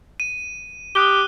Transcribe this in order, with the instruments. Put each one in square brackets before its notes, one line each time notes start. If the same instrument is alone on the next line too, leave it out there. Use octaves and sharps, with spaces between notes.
[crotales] D#7
[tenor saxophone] G4 [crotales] D#6 F#6 G7